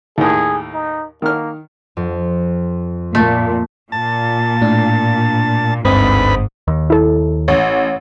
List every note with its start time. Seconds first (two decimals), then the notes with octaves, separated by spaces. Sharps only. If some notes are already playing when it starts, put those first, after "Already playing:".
0.18 D#2 A2 G#4
0.74 D#4
1.22 D#3 A#3 F6
1.97 F2
3.15 A#2 A3
3.92 A#2 A5
4.62 A2 D4
5.85 G1 D2 G#2 C4 B4 B5 D#6
6.68 D#2
6.90 E4 A4
7.48 A1 C#5